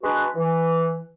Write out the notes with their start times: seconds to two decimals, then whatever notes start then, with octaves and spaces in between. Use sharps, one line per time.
0.02 G#3 D4 F#4 B4
0.36 E3